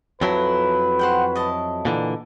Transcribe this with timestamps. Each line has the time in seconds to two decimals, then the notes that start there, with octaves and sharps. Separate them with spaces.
0.21 F2 F#3 E4 A4 B4 A#5
0.99 C5 F#5 G5
1.35 D#5 A5
1.85 A#2 D3 E3